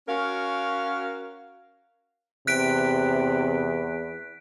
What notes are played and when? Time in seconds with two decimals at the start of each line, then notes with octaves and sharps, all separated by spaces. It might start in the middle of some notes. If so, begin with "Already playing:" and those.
0.09 C#4 F#4 A#4 F5
2.47 E2 C3 F#6 B6 D7